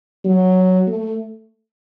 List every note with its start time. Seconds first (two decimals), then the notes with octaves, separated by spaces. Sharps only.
0.25 F#3
0.87 A3